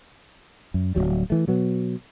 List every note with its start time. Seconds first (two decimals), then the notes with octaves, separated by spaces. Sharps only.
0.74 F#2
0.95 D1 F2 F#3 G3
1.30 E3 A3
1.48 B2 F#3 B3